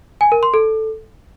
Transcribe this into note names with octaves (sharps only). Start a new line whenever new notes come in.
G#5
A#4
C6
A4